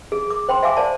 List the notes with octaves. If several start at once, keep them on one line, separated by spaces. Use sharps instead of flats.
G#4
D6
C5 G5 B5 C6
E5 F5 G#5 D6
C5 D5 A5